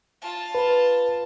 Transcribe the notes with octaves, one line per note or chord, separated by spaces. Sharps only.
F4 A5
B4